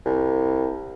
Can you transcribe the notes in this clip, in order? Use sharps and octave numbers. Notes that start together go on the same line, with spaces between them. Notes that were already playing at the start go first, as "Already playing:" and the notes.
C2